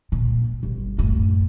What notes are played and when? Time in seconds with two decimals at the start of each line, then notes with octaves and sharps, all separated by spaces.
0.12 A#2
0.63 G1
0.98 F#2 A2